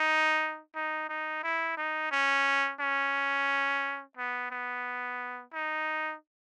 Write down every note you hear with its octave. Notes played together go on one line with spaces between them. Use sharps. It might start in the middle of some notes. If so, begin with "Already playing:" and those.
Already playing: D#4
D#4
D#4
E4
D#4
C#4
C#4
B3
B3
D#4